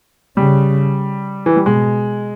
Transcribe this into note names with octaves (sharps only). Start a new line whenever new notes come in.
C#3 G3
E3
G3
B2 G#3